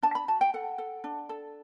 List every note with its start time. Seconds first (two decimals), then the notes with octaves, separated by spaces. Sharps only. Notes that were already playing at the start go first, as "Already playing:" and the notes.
0.03 D4 A5
0.15 B5
0.28 F#4 A5
0.41 G5
0.54 A4 F#5
0.78 A4
1.04 D4
1.29 A4